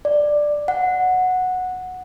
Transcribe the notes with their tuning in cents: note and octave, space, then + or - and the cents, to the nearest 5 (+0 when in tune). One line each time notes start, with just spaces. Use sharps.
D5 +10
F#5 -10